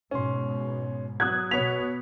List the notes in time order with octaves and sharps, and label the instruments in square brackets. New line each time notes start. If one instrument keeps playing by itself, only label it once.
[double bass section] G#2 B2 [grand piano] C#4 C6
[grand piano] F#3 E6 [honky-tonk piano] D#6 F#6 G#6
[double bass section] B2 B3 [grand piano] F#4 C#5 [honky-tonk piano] B6 F7